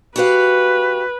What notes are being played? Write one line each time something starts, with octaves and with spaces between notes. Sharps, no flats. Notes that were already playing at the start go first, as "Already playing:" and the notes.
F#4 G4 B4 F5